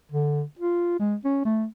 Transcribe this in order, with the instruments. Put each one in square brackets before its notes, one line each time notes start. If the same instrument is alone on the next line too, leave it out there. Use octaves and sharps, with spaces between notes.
[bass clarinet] D3
F4
G#3
C#4
A3